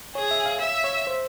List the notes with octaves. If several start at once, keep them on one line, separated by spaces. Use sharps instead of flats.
G#4 C#5
E5
F5
E5
C#5
C5